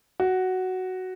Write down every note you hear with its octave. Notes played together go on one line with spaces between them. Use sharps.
F#4